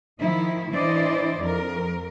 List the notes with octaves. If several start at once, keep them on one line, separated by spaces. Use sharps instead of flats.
D#3 F3 D#4 E4
E3 D4 E4 C5 D5 D#5
F2 A#4